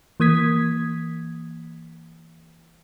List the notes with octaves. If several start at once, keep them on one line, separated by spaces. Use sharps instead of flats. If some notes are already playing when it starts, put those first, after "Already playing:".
E3 A#3 D#6 G#6 B6